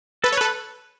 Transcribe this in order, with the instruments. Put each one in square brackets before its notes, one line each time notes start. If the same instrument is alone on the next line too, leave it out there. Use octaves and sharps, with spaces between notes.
[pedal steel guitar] A4 [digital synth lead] B4
[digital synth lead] C#5
[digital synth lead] A4 [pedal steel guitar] B4